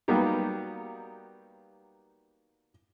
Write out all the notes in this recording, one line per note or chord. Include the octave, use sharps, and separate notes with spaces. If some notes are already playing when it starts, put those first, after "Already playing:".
F#3 G3 A#3 B3 D#4 G4